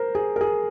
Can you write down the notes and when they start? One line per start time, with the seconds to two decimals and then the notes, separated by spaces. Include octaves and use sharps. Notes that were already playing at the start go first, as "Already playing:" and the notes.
Already playing: A#4 C5
0.15 G#4
0.36 A#4
0.41 G#4